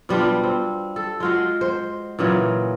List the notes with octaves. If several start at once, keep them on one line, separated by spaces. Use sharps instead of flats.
B2 G3 D4 F4
C4
A4
G#3 F4 F#4
C5
A#2 C#3 E3 F#3